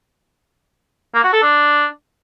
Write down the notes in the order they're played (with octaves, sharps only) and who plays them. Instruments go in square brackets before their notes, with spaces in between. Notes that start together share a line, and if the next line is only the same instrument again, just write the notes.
[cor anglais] A#3
F#4
A4
D4